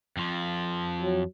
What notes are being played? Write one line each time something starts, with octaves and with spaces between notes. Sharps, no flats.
F2 F3
F#3